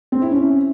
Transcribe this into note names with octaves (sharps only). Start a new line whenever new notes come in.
C4
E4
C#4